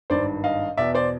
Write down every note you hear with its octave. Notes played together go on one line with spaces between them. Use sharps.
G#1 G2 D#3 C5 D5
D#5 F5
E2 B2 D5 E5
C5 D5